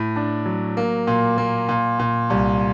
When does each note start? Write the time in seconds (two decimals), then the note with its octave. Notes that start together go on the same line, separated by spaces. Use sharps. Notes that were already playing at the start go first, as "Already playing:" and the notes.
Already playing: A2
0.16 D4
0.46 F#3
0.77 A#3
1.07 A#2
1.38 A#3
1.69 A#2
1.99 A#2
2.30 C2